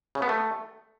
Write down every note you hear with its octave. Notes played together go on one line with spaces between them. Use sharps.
C#3
B3
A3